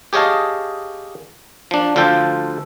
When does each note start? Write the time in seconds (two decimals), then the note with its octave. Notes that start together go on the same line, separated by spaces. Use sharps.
0.13 G4 G#4 C#5 D#5 F5 A5
1.71 F3 D4
1.96 D2 F3 F4 A4 G5